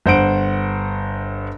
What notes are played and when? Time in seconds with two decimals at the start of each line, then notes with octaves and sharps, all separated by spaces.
0.06 G1 C5 F#5 D7